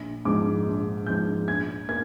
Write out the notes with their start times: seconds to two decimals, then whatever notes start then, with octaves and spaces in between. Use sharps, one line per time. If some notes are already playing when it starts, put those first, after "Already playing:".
Already playing: A#1
0.25 G#2 F3 D6
0.66 A#1
1.07 G#2 F3 G6
1.47 A#1 G#6
1.89 A#3 G#6